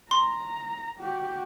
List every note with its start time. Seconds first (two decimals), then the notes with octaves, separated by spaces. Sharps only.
0.11 A#5 C6
0.99 F#4 G4